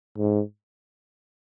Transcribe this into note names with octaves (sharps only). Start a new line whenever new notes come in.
G#2